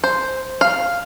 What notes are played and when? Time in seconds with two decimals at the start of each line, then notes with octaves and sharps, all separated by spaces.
0.04 C5
0.61 F5